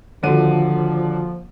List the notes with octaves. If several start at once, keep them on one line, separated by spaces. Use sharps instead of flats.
D#1 D3 F3 F#4 A4 D#7